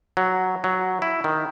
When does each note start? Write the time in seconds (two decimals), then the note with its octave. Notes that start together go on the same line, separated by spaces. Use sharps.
0.17 F#3
0.64 F#3
1.02 E4
1.24 D#3